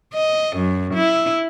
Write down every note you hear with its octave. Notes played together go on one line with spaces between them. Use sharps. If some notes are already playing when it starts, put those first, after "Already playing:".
D#5
F#2
E4